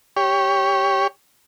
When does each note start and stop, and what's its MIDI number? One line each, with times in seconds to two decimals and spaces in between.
0.16 1.07 67
0.16 1.07 73